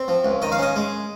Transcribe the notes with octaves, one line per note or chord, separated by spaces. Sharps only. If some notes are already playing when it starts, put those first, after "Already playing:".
Already playing: C4
F3
C#2
D#3 D#5
F5
C#4 D#5
G#3